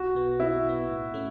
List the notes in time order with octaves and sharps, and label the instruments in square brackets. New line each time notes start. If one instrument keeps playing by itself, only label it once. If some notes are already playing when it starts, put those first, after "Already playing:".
Already playing: [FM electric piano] B1 [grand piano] F#4
[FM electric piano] B2 B3
[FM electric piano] B1 [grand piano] E4
[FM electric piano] B2 B3
A2
A3 C#4